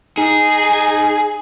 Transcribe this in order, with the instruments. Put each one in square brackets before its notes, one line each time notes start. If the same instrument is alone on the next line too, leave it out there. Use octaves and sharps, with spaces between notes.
[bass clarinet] D#4 [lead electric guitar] G#4